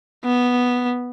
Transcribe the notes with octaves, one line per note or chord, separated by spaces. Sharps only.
B3